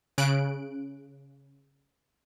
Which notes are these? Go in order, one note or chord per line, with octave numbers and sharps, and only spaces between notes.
C#3 F#6 D7